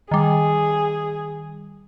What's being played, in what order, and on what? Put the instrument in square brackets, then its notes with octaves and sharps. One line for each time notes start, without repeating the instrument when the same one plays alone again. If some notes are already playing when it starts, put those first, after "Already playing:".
[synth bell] D#3 G3 [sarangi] G#4